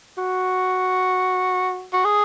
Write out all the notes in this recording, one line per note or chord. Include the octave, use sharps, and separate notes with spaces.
F#4
F#4
G#4